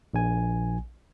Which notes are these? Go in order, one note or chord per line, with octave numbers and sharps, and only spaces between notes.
A#1 G#5